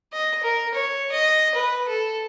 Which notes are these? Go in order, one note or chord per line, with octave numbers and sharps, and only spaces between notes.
D#5
A#4
C#5
D#5
B4
A4